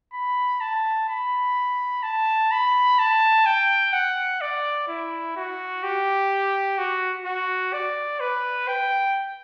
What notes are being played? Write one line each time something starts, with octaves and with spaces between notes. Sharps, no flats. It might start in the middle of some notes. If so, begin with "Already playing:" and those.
B5
A5
B5
A5
B5
A5
G5
F#5
D5
E4
F#4
G4
F#4
F#4
D5
B4
G5